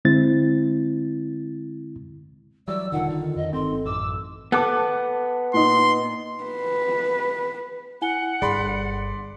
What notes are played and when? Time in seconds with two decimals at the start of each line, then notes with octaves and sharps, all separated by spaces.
0.05 D3 G#3 C4 E4 A6
2.68 E3 F#3 G3 D5 E6
2.92 E1 D3 D#3 F4 F#5
3.09 D3 D#4
3.36 F2 D#5
3.53 G1 C4 A4 C6
3.86 A1 F#2 D6 E6
4.52 B3 A4 A5 D6 F#6
5.54 A#2 D#4 C6
6.44 B4
8.02 E4 F#5 G#5 G7
8.42 G1 G#4 D5 B5 C6